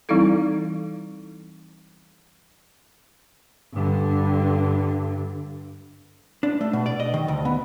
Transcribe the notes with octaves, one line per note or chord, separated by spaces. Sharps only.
E3 G3 C4 D#4 E4 A4
G2 D3
D4
A3
B2
D5
D#5
D#3
D2
B3